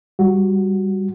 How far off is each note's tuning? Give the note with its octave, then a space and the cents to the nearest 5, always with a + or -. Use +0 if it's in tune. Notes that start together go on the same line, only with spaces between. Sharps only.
G3 +0 F#4 -5